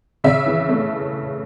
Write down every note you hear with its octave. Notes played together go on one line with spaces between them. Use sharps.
C#3 E5
E3
A3